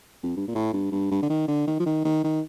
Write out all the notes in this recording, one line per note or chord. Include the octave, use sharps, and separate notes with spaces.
F2
G2
A#2
A2
G2
G2
G2
D3
D#3
D3
D#3
F3
D#3
D#3
D#3